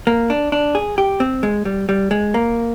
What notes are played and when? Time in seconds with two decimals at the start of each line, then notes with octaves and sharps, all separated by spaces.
0.07 A#3
0.30 D4
0.52 D4
0.75 G#4
0.98 G4
1.20 C4
1.43 G#3
1.65 G3
1.89 G3
2.11 G#3
2.34 A#3